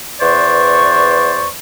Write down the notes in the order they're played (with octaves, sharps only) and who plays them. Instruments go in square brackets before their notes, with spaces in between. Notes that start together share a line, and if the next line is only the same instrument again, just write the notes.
[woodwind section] E2 B4 C5 D5 C#6